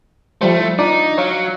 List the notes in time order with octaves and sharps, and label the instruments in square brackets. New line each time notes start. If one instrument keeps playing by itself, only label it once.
[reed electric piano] F3 G3 C5 [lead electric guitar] A3
[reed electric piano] E4
[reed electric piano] D4 F4 D5 [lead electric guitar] D#4
[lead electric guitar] F#3 [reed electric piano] C#5 F5